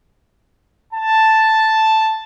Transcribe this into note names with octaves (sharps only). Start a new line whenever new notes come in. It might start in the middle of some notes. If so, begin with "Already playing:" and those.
A5